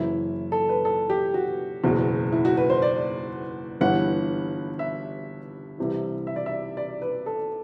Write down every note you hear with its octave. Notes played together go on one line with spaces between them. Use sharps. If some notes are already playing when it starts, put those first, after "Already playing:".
Already playing: F#1 F#2 E3 E4
A4
B4
A4
G4
F#4
F#1 E2 B2
E4
F#4
B4
C5
D5
G1 G2 E3 F#5
E5
C2 C3 E3
E5
D5
E5
D5
B4
A4